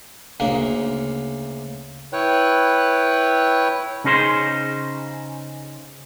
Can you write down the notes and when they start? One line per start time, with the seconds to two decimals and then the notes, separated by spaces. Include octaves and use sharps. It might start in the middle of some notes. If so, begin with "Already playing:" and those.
0.40 D2 C#3 A#3
2.13 E4 B4 C#5 G5 F#6
4.04 C#3 C#4 D#4 G#4 B4 C5